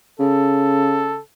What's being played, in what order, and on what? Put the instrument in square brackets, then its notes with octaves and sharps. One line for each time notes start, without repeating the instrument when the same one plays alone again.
[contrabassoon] C#3 [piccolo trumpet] A4